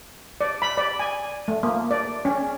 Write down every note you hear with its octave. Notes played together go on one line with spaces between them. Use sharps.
D5
B5
D5
G#5
A3
A#3
D5
C#4